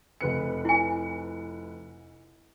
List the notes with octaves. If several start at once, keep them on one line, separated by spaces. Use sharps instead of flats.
F1 B4 C#7
E4 G#5